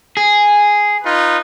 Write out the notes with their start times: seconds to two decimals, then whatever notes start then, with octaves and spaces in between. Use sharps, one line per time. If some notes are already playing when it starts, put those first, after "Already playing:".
0.17 G#4
1.04 D#4 F4 B4